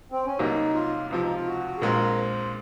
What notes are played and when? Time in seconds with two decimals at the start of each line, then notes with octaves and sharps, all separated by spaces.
0.12 C4
0.26 C#4
0.39 C2 C3 F#3 A#3 D#4
0.74 F4
1.10 C#2 C3 F3 F4
1.22 D#4
1.34 F4
1.47 F#4
1.78 G#4
1.82 A#1 A#2 G#3 C4 A#4
2.17 C5